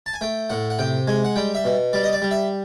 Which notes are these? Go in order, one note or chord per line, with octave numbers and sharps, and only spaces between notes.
A5
G#5
A3 G5
A2 F#5
F#5
C3 G5
G#3 G#5
F#5
G3 G5
E5
B2
G3 D5
D#5
D5
G3
E5